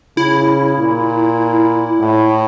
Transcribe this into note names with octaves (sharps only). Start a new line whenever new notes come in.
C#3 E4
A#2
A2